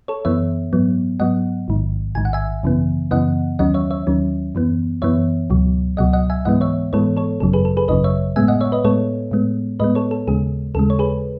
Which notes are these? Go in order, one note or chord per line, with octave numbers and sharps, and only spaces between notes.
A4 C#5
F#2 E3 B3 C#5 E5
G#2 F#3 B3
G#2 F#3 B3 D#5 F#5
A1 G#2 D#3
A1 G#2 D#3 G#5
F#5
E5 G#5
F#2 C#3 E3 B3
F#2 C#3 E3 B3 D#5 F#5
D#2 D#3 F#3 C#4 D#5 F#5
C#5 E5
C#5 E5
D#2 D#3 F#3 C#4
F#2 E3 B3
F#2 E3 B3 C#5 E5
C#2 B2 F#3
C#2 B2 F#3 D#5 F#5
D#5 F#5
E5 G#5
G#2 E3 G#3 B3 D#5 F#5
C#5 E5
G#2 E3 G#3 B3 A4 C#5
A4 C#5
G#1 F#2 C#3 F#3 A4
G#4 B4
A4
G#4 B4
G#1 F#2 C#3 F#3 B4 D#5
C#5 E5
A2 G#3 B3 E5 G#5
D#5 F#5
C#5 E5
B4 D#5
A2 G#3 B3 A4 C#5
A2 G#3 B3
A2 G#3 B3 B4 D#5
A4 C#5
A4
D#2 C#3 G#3 G#4
D#2 C#3 G#3 A4
C#5
G#4 B4